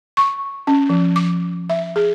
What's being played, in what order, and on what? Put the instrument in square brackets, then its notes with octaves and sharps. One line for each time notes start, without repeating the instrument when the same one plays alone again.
[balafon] C#6
C#4
F3
D6
E5
G#4